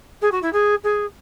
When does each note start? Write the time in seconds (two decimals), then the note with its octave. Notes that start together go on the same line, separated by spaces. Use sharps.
0.21 G#4
0.31 F#4
0.42 E4
0.53 G#4
0.83 G#4